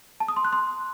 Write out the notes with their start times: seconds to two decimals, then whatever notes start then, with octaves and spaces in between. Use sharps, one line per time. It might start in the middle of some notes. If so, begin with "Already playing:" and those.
0.20 A5
0.28 D#6
0.36 C6
0.45 F#6
0.53 C6